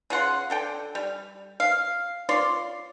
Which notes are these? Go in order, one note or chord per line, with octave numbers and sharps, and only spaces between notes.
C#3 F4 F#5 C6
D3 A4 G5
G3
F5
F4 C#5 D5 C6